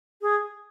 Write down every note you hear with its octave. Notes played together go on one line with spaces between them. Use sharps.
G#4